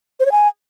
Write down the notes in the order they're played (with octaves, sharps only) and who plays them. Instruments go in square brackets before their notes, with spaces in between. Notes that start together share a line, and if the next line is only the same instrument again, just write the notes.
[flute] C5
C#5
G#5